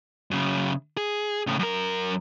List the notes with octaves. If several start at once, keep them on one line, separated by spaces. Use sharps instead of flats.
F#2 C#3
G#4
A2 C#3
F#2 A#4